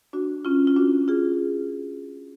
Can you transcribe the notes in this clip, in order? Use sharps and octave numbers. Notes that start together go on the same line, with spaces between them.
D4 F#4
C#4 F4
F4
D4 F#4
F4 G#4